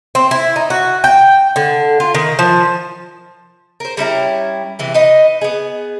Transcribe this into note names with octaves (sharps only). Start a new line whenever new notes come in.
C4
E4
D#4
F#4
G5
D3
F4
D#3
F3
A#4 C5
G3 C#4 E4 A#5
C3 E3 B3
D#4 B4 D#5
B3 G#4